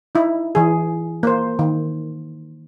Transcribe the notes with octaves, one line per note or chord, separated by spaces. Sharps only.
D#4 E4
E3 G#4
A#3 C5
D#3